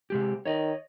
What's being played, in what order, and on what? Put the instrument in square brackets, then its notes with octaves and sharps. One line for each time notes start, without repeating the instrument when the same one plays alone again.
[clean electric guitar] C3 G#3 G4
[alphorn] D#3 [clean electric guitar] C#5 D#5